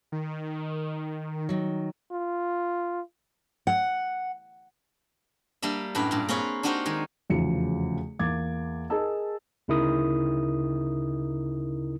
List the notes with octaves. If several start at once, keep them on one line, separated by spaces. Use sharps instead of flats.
D#3
D#3 F#3
F4
F#5
G3 A#3 D4 E5
F#2 A2 D4 B4 B5
G2 A#2
A#3 C4 G#4 B4 C#5 F5
D4 D#4 F#4 G4 A#4 C5
D#3 G#3
F1 E2 C#3 F3 F#4 C#7
E2 A#3 D6 G#6 A6
G#4 A#4 D#5 A5 E6
D2 C#3 D#4 E4 A#4 D#6